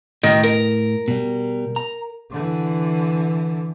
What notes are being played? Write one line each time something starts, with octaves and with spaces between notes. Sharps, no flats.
A2 D#3
A#4
B2 G3
A#5
D3 E3